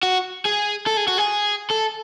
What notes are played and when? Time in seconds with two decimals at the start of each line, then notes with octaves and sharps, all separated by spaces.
0.03 F#4
0.45 G#4
0.86 A4
0.97 G#4
1.07 F#4
1.18 G#4
1.70 A4